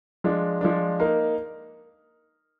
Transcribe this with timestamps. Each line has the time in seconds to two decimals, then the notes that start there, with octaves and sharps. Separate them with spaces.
0.24 F3 G#3 D4
0.61 F3 G#3 D4
1.00 A#3 D#4 A#4